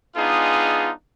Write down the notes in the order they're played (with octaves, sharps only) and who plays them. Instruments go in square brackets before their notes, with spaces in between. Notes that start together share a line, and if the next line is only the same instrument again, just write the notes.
[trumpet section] G#3 B3 D4 D#4 F4 G#4